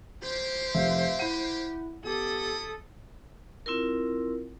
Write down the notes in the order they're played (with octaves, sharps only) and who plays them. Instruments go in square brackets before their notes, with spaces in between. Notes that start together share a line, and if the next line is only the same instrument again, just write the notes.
[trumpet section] A#3 G4 [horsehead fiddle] C5
[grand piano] F1 [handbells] E5 F5 C6
[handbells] E4 F#5 [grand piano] D#7
[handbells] B3 G4 [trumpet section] E4 D#6 [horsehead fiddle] A4
[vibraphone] C4 E4 F4 A#4